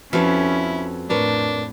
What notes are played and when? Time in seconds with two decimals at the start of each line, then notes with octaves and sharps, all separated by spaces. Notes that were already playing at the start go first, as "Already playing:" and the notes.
0.13 F2 C#4 E4 F#4 A4 B4
1.10 A2 D4 A#4 B4 C#5